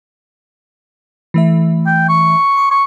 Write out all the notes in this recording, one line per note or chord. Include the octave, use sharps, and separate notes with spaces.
E3 A3 E5
G5
C#6
C6 D6
C#6